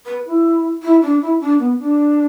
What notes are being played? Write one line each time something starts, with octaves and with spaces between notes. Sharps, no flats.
B4
E4
E4
D4
E4
D4
B3
D4